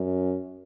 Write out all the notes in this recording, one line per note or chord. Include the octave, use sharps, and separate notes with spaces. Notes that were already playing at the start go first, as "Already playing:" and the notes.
Already playing: F#2